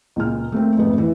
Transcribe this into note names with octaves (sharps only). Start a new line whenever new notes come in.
C#2 A#2 F6
A3 A#3 C4
F2 G#2 A3 B3
E3